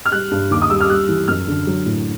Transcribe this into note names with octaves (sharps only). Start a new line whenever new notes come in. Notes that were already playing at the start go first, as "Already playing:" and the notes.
F6
G3 F#6
G2
D#2 D6
D#6
G3 E6
F6
G3 F#6
E3
F#2 F6
D3
F#3
A2